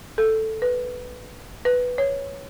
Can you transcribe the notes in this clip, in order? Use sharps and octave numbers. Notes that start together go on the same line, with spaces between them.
A4
B4
B4
C#5